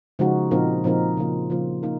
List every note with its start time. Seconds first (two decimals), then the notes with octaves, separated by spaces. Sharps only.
0.19 C#3 F3 G#3 D#4 F#4
0.51 A#2 F3 C4 D#4 A#4
0.84 A#2 F3 C4 D#4 A#4
1.17 C#3 F3 A#3 F4
1.50 C#3 F3 A#3 F4
1.83 A#3 D#4 A#4